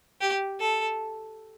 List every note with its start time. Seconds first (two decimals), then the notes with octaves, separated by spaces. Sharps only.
0.21 G4
0.60 A4